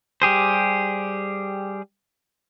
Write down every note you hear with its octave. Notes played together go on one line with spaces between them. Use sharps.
G3 G4 G#4 C5